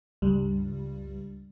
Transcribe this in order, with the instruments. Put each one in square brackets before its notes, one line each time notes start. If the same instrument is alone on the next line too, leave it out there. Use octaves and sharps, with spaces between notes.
[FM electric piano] C#2 G2 G3